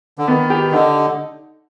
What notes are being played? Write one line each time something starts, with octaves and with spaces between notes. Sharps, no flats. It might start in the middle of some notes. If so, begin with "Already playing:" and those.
D3
D#3 B3
G4
D3 D#4